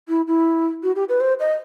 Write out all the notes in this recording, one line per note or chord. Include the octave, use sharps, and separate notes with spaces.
E4
E4
F#4
G4
B4
C5
D#5